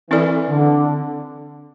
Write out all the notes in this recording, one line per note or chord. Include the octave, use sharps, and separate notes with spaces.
E3 C4 E4 A4 D5
D3